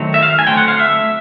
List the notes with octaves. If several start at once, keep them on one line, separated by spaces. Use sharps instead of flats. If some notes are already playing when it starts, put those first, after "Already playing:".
Already playing: D#3 F#3 A3 C4
E5
F5
G#5
D3 F#3 A3 C4 G5
F#5
F5
E5